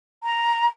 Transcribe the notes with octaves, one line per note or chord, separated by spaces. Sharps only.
A#5